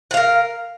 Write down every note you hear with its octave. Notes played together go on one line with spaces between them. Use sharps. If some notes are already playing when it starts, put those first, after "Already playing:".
A#4 F5 F#5